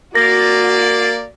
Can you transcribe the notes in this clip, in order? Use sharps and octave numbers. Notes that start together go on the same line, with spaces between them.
A#3 F#4 D5 A#6